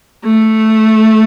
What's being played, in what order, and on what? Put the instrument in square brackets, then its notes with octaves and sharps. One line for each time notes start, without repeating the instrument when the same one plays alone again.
[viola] A3